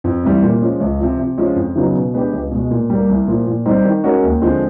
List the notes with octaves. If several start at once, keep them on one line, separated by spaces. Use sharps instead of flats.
F2
C3 E3 G3
A#2
F3 G#3 C#4
C#2
C3 F3
C3
F3 G#3 C#4 F4
F2
C#3 F#3 B3 D#4
B2
G#3 B3 D4 G4
C#2
B2 G#3
A#2
G3 A#3
C2
A#2 F3
A#2
G3 C4 D#4 G4
D#3
G#3 C#4 F#4 A#4
D#2
D3 F3 G#3 C4